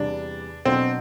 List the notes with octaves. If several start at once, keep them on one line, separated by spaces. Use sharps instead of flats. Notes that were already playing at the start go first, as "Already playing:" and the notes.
Already playing: E2 C3 G3 D4
B2 F#3 B3 C4 D4